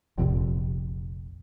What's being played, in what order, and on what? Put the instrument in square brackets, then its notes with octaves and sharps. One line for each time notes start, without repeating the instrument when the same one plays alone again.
[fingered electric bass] F1 A#1 F2 C3